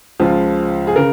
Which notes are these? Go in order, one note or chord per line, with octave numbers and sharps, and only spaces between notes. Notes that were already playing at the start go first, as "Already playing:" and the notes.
C#2 C#3 F3
G#4
C#3 A#4